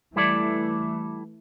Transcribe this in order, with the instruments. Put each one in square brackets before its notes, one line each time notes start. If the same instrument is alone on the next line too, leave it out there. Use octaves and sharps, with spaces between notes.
[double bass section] E3 A3 [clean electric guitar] G3 E4 A4 D5